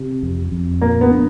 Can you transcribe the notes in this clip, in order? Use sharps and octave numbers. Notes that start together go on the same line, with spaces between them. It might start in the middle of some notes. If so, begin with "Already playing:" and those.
Already playing: C3
F2
F2
A#2 A#3
B3
D4